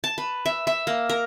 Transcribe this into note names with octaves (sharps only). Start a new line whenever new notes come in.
A5
B4
E5
E5
A#3
A#4